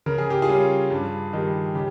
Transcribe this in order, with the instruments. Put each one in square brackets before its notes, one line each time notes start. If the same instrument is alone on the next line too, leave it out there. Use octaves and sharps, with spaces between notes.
[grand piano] C#3 A#4
G#4
G4
F4 G#4
G3 C#4
G2
D#3 G3
C#3 G4